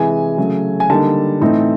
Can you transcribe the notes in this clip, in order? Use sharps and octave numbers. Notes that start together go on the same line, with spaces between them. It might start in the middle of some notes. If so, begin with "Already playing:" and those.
Already playing: C3 E3 G#3 G#5
C#3 F#3 A3
G#5
D3 G3 A#3 D#4 A5
A2 E3 A3 C4 D#4